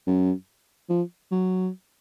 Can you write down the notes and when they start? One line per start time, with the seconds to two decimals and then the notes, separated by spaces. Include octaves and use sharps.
0.07 F#2
0.89 F3
1.31 F#3